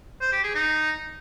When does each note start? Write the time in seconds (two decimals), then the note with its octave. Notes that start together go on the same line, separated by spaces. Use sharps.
0.21 C5
0.32 G4
0.43 G#4
0.55 D#4